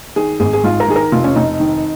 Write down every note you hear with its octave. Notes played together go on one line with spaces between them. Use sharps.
D#3 G#4
G#1 G#4
G#4
G#2 F4
A#4
D#3 G#4
A#4
F1 F4
C#4
F1 D#4
D#3